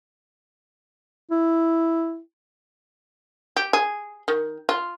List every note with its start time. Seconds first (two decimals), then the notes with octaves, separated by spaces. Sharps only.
1.31 E4
3.56 G4
3.73 G#4
4.28 D#3
4.69 F4